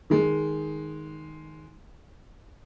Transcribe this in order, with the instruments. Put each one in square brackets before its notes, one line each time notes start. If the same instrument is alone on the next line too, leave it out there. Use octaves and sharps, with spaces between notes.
[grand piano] D#3 G#3